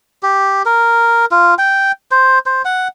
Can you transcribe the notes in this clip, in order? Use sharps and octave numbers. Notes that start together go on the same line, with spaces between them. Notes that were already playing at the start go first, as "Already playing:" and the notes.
G4
A#4
F4
G5
C5
C5
F#5